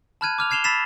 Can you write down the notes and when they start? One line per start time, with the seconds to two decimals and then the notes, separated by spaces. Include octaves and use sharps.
0.21 A5 B5 F6 F#6 G#6 D#7
0.38 D6 F6 F7
0.50 F6 G#6 C7 E7 F7 G7
0.64 B5 E6 A6 B6 C7 E7